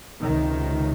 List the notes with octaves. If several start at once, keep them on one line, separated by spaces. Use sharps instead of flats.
C#2 C3 D#3